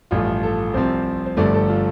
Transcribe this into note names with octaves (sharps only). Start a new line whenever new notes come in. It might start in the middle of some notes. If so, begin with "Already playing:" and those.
A1 G2 F3 A3 F4
A4
C2 C3 F3 C4 C5
C5
G1 G2 D3 F3 A3 D5
A4
F4